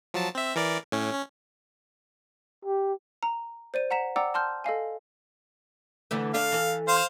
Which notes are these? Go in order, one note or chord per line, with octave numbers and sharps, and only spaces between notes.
F3 F#3 A5
C4 E5
E3 A#4 D5
A2 C#4
C#4
G4
A#5
C5 D5 D#7
F#5 A#5 B6 E7
D5 F#5 G5 A#5 D6 E6
A5 C6 F6 G6
A4 D#5 F5 G#5
D3 E3 A3
D3 A3 D4 F5
E3 A4
C5 F5